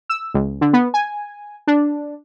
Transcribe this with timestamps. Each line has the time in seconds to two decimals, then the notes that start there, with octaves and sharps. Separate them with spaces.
0.10 E6
0.34 C#2
0.61 D3
0.73 B3
0.94 G#5
1.67 D4